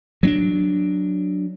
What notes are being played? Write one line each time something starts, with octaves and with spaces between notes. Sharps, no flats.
F#3 C4 D4